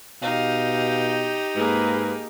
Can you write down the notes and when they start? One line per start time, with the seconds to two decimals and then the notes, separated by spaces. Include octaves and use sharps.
0.22 B2 D#4 G4 F5
1.56 G#2 A#3 G#4 B4